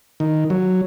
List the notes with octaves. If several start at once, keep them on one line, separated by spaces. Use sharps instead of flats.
D#3
F#3